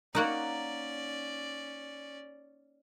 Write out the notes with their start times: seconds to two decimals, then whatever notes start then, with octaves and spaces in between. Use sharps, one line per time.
0.15 A#3 C#4 D#4 F#4 A#4 D5 F#5